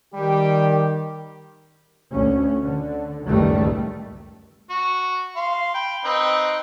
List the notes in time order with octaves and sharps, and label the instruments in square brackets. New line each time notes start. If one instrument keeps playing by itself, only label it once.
[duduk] D#3 [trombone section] G3 G4
[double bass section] D2 C#4
D3
F#1 C#2 A2 D#3 G3 A3
[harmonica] F#4
F5 C6
G5 B5
C4 D#4 B4